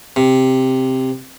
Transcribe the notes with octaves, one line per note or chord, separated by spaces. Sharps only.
C3